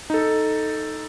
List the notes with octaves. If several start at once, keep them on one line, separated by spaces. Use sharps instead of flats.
D#4 A4